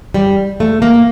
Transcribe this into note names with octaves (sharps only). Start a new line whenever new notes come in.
G3
A3
A#3